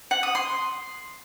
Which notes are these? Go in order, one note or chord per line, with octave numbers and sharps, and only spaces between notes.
F#5
D#6
C6